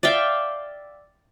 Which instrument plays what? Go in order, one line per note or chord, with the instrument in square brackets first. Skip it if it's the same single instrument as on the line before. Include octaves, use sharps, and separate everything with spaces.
[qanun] D5 E5 F5 G5